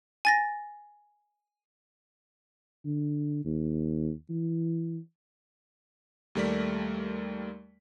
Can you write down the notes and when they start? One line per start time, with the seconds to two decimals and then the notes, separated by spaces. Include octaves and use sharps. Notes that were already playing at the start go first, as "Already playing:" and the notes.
0.25 G#5 A6 A#6
2.85 D3
3.45 D#2
4.29 E3
6.35 D#2 G3 A3 A#4 D5 B6